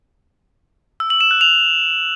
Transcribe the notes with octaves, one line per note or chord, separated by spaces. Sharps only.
E6
F#7
E7
F#6
F7